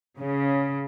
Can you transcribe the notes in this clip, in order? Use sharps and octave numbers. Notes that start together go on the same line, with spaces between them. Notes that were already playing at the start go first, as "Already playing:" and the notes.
C#3